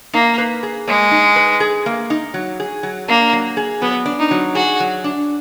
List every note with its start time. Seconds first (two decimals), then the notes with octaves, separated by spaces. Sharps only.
0.13 A#3 D#4
0.38 B4
0.63 G#4
0.88 G#3 A#3
1.11 D#4
1.36 B4
1.60 G#4
1.86 A#3
2.10 D#4
2.34 F#3
2.60 G#4
2.83 F#3
3.09 A#3 D4
3.33 F#3
3.57 G#4
3.82 F#3 B3
4.06 D4
4.19 D#4
4.31 F#3
4.55 F#4 G#4
4.80 F#3
5.04 D4